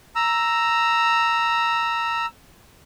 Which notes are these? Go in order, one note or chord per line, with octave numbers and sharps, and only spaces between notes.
A#5 E6